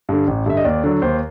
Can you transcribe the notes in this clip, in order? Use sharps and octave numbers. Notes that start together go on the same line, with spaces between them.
G2 D3
A1
G2 D3 E5
D#5
D#2 D5
D3 F#3
D#2 C5